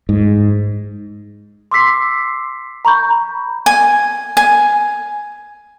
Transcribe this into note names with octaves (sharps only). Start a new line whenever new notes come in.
G#2
C6 D6 E6 B6 C7
A#5 B5 C#6 G6
G#5
G#5